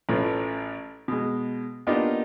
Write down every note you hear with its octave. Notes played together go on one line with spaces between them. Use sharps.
A1 A2 C#4 F4 B4
B2 G#3
A#3 B3 D4 D#4 F4 G4